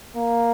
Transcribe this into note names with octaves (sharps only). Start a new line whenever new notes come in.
A#3